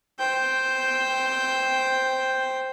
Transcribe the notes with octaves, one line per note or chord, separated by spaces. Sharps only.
C5 G5